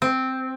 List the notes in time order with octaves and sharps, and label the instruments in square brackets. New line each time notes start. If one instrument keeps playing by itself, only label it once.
[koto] C4